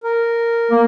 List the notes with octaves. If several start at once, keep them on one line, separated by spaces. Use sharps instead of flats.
A#4
A#3